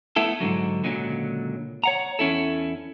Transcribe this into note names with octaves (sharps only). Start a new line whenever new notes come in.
A3 B3 E4 A4
G#2 B2 D3 F#3
C#2 A#2 D3 F3 F#3
C#5 F#5 A#5
E2 C#4 E4 A4